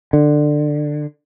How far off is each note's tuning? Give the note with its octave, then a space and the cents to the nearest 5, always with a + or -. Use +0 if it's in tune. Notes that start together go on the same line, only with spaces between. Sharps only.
D3 +15